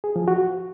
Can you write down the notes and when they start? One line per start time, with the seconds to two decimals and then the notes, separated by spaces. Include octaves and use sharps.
0.04 G#4
0.16 F3
0.28 F#4